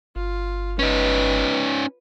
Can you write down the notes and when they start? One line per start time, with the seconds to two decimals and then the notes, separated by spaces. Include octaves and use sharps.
0.16 G1 F4
0.79 C#4 D#4 B4